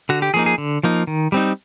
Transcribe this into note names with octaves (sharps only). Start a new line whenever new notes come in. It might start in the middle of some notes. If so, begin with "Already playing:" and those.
D3 F#4
G4
F3 A#3 D#4 G#4
G#4
D3
F3 A#3 D#4
D#3
G3 C4 D#4